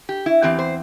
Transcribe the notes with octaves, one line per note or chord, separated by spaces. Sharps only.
G4
E4
E2 E3 C4 G4
C5